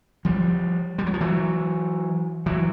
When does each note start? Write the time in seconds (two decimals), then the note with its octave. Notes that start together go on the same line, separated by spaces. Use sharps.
0.25 F3 G3
0.98 G3
1.07 F#3
1.14 F3
1.21 E3 F#3
2.46 E3 F#3